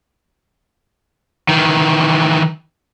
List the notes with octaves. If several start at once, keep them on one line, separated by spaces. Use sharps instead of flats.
D#3 E3